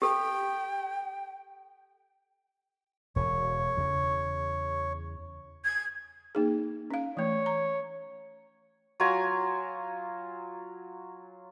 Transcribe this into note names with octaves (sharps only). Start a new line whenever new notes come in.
G4 A4 G5
E1 B2 C#5
E2 C#3
G#6
A#3 D#4 G#4
C#4 F5
E3 A3 C#5
A#5
F#3 F4 G#5 A#5